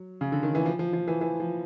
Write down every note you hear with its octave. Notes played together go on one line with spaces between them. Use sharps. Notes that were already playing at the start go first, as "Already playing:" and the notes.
Already playing: F#3
C#3
D3
D#3
E3
F3
F3
F3
E3
E3
F3